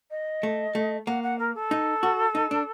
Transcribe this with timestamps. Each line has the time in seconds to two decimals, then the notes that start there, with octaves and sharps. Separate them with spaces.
0.11 D#5
0.43 A3
0.75 A3
1.07 A#3 F#5
1.23 F#5
1.39 A#4
1.55 A4
1.71 D#4
2.03 F#4
2.35 D#4
2.51 D4